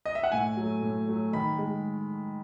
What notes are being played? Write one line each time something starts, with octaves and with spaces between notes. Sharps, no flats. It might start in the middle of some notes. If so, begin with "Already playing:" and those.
D#5
E5
F#5
A2 G#5
F#3 A3
A2
F#3 A3
D#3 B5
G#3